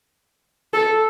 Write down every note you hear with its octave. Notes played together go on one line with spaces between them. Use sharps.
A4